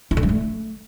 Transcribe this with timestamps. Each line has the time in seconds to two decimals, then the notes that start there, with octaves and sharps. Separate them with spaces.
0.11 E4
0.17 D3
0.23 G3
0.29 A3